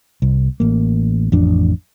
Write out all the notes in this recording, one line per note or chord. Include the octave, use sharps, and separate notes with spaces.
C2
A1 A#3
A1 F2 D4